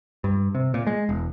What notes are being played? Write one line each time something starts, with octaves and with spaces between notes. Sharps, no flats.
G2
C3
A#2
G#3
E1